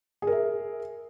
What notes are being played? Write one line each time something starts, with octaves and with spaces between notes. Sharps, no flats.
G#4 A#4 E5